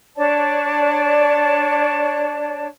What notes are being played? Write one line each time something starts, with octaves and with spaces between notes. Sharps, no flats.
D4 C#5 D5 A5